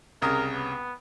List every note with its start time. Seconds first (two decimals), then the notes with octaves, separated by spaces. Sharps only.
0.22 C2 C#3 A#4 D#6
0.54 B3